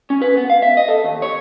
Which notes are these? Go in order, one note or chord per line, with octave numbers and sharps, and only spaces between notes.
C#4
B4
B3
F5
E5
D#5
A4
D#2
C#5